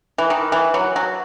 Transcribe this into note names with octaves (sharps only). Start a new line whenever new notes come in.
E3
D#3
E3
F#3
F#3